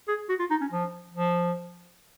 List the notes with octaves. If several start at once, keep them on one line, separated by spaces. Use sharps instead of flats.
G#4
F#4
F4
D#4
C#4
F3
F3